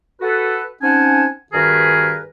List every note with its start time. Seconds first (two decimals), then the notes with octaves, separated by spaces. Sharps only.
0.22 F#4 A4 B4
0.83 C4 C#4 D#4 F#5 G#5 A5
1.53 G2 D#3 F#4 G#4 A#4 B4